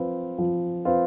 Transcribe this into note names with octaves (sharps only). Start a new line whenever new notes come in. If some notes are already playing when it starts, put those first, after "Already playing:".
Already playing: F3 C4 F4 B4
F3
C4 F4 B4